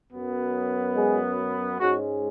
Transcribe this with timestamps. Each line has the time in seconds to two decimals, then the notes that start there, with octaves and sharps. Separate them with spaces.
0.12 F#2 F#3 B3
0.95 G#3 G#4
1.78 G#2 G#3 C#4 F#4